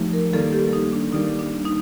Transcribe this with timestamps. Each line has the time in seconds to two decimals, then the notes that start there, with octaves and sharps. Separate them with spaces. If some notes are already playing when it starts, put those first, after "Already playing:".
Already playing: F3 A3 D#4 G4
0.13 A#4
0.33 D#3 G3 A#3 A4
0.53 G4
0.73 D#4
0.93 D4
1.12 D#3 G3 A#3 D#4
1.39 D4
1.65 D#4